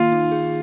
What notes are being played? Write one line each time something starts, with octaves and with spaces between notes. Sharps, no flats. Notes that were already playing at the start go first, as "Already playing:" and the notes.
Already playing: D#3 A#3 F4
D#4
G#4